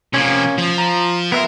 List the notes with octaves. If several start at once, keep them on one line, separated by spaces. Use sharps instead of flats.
C3 F3 A#3 C#4
F3
A#5
B3 A#4 E5 C6